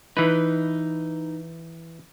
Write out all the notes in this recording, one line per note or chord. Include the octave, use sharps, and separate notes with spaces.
E3 D#4 B4